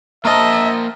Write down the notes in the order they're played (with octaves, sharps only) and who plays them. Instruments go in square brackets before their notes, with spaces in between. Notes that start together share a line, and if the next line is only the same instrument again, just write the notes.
[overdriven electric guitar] A#3 C5 [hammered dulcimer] A#4 A5 [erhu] D#5 [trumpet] E5